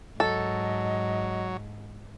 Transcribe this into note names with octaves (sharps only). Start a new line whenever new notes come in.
G#2 F#3 A4 D#5